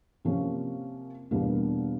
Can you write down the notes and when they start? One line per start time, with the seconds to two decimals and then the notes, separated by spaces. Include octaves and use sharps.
0.25 C3 F3 A#3 C#4
1.31 E2 B2 G3 A#3 D4